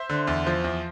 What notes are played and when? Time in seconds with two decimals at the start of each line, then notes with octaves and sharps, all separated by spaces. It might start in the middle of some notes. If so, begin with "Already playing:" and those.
Already playing: C5 E5
0.09 D3
0.27 E2
0.47 F3
0.64 E2